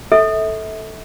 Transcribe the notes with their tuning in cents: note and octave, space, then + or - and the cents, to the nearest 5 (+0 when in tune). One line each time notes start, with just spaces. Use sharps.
A4 +0 E5 -35